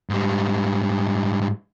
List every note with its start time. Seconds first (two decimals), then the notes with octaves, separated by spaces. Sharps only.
0.10 G#2 G3